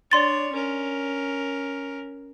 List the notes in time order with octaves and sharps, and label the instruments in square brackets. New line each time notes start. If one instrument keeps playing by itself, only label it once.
[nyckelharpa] D4 C#5 [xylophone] D5 C6 A6
[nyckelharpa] C#4 A#4